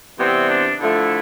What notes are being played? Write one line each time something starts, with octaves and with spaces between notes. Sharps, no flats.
C3 E3 G3 B3 C4
D4
D3 F3 A3 E4